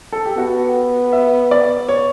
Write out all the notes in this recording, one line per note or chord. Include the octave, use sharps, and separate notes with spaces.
A4
G4
B3 F#4
E5
D5
C#5